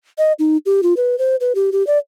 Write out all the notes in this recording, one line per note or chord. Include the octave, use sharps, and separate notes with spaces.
D#5
D#4
G4
F4
B4
C5
B4
G4
G4
D5